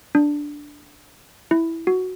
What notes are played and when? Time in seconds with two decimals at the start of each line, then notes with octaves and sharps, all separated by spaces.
0.15 D4
1.51 E4
1.87 F#4